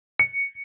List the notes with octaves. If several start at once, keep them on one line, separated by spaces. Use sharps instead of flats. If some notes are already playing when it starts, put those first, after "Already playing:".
C#7